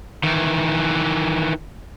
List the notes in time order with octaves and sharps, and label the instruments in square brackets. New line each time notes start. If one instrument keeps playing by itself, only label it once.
[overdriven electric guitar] D#3 E3